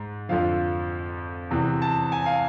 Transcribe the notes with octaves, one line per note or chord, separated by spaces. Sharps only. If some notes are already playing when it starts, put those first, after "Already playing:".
Already playing: G#2
F2 D3 F3 F5
E2 C3 E3
A5
G#5
F5